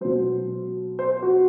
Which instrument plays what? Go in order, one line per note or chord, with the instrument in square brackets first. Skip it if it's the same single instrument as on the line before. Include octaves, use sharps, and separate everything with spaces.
[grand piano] B2 F#3 C5
C5
F#4